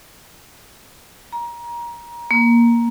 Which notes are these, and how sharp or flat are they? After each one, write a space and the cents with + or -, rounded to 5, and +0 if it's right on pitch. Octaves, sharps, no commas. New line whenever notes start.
A#5 +25
A#3 +10